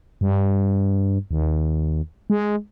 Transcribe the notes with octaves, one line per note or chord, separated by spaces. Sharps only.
G2
D#2
G#3